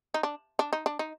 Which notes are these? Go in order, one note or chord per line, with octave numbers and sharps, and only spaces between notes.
D#4
D4
D4
D#4
D4
D#4